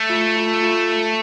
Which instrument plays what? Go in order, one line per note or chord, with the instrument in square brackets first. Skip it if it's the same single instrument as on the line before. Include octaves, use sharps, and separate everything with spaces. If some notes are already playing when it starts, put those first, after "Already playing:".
Already playing: [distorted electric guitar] A3
[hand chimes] F4
F4
F4